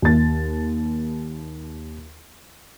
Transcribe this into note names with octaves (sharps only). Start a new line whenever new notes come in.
D#2 A6